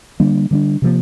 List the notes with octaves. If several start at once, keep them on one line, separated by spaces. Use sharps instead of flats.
D3 G3 A#3 D4
D3 G3 A#3 D4
C3 F3 A#3